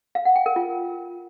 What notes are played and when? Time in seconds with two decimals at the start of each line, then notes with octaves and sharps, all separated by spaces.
0.15 F5
0.25 F#5
0.36 G5
0.46 A#4
0.56 F4